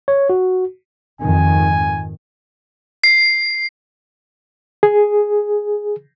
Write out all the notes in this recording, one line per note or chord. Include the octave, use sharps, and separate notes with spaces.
C#5
F#4
F2 G#2 D#3 G#5
C7
G#4